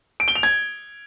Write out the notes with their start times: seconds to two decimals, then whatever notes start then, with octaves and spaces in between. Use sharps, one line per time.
0.20 D7
0.28 G7
0.35 F7
0.43 G#6